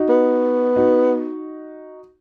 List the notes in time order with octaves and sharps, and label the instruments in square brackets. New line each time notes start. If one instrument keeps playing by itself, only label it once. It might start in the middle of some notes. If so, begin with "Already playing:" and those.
Already playing: [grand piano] D#4 F#4
[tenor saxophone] B3
[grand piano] D#4 F#4